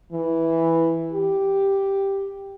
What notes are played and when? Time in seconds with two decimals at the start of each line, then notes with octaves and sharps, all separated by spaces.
0.12 E3
1.12 G4